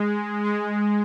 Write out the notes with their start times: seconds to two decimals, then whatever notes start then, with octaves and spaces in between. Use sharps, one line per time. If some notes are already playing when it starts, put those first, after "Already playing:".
Already playing: G#3
0.44 G#3